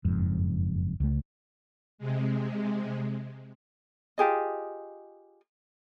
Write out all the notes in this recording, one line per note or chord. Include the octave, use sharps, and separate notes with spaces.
F#1 F2 G#2
C#2 A3
C3 G#3
F4 G4 G#4 D#5